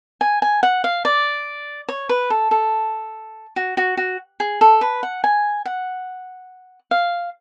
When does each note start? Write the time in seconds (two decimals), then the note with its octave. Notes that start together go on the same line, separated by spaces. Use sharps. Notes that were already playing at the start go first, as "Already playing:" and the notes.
0.21 G#5
0.42 G#5
0.63 F#5
0.84 F5
1.05 D5
1.89 C#5
2.09 B4
2.30 A4
2.51 A4
3.56 F#4
3.77 F#4
3.97 F#4
4.40 G#4
4.61 A4
4.81 B4
5.03 F#5
5.24 G#5
5.65 F#5
6.91 F5